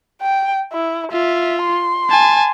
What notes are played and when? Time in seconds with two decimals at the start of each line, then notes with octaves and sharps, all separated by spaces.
0.21 G5
0.72 E4
1.12 F4 E5
1.64 C6
2.09 G#5 A5